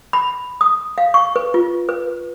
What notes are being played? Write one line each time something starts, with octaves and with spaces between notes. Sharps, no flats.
B5
D#6
F5
C#6
B4
F4
B4